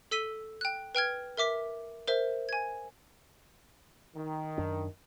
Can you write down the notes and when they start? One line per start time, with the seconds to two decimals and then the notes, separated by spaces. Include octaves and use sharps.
0.11 A4 E6 B6 D#7 G7
0.61 G5 F#6
0.95 B4 G5 F6 G#6
1.37 A#4 E5 D6 B6
2.08 A#4 C5 E5
2.49 G#5 G#6
4.15 D#3
4.58 F#2 D4